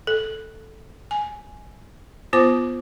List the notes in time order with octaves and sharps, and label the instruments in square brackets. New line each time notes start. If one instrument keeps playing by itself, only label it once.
[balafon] A4
G#5
B3 F4 C5 D6